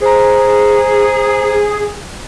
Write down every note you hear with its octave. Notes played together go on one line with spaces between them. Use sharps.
G#4 C5 A#5